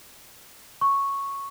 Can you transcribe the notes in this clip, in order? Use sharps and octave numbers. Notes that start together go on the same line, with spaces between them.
C#6